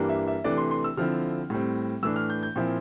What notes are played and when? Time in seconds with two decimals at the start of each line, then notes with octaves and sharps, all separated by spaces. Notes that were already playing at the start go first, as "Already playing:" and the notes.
Already playing: G2 E3 G3 A#3 D4
0.09 E5
0.27 E5
0.44 C3 E3 A3 D4 D5
0.58 C6
0.71 C6
0.84 E6
0.97 D3 F3 C4 E4 F6
1.50 A2 G3 C4
2.03 A2 E3 A3 D4 E6
2.16 F6
2.30 G6
2.43 G6
2.56 A#2 F3 C4 E4